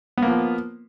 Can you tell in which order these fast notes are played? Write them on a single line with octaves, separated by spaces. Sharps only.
B3 A#3 F3